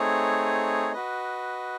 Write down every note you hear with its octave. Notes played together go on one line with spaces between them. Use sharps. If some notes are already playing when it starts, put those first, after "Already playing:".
Already playing: A3 C4 D#4 G#4 C#5
F#4 B4 D#5